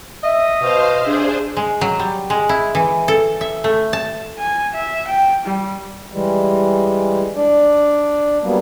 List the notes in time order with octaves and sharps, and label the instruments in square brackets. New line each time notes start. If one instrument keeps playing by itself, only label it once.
[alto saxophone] D#5 [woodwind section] E5
[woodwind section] B2 [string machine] C5 F5
[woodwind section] C3 E5 [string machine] D4 G#4 C5
[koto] G#3
F#3
G3
G#3
E4
E3
A4
E5
A3
A5
[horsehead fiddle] G#5
E5
G5
G3
[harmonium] E3 G3 G#3
D4 D5
F#3 G3 A#3 B3